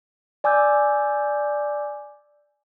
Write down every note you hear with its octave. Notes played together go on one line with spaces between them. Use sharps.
D5 G#5 D6 E6 G6